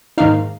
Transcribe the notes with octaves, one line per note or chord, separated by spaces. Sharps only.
G#2 D#3 A#3 D#4 F5